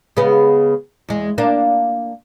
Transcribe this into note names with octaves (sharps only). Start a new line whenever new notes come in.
C#3 G#3 B3
E2 G#3
A#3 D4